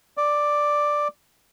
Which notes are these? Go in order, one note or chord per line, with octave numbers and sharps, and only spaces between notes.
D5